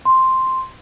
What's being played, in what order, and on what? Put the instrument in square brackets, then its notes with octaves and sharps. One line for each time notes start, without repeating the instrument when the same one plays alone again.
[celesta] C6